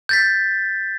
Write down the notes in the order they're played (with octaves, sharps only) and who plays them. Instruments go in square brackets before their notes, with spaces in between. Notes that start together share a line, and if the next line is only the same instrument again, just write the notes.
[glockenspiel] G6 A6 B6